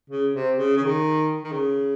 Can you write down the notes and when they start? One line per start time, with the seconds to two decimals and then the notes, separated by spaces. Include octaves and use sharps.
0.10 C#3
0.33 C3
0.56 C#3
0.77 C#3
0.80 D#3
1.44 D#3
1.52 C#3